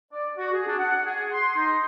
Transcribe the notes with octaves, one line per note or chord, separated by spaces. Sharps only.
D5
F#4
G#4
D4
F#5
G#4
C6
D#4